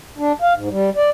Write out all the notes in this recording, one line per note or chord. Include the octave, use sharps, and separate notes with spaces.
D4
F5
G#2
G3
D5